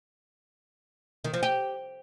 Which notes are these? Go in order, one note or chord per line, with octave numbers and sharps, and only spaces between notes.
D#3
F3
G4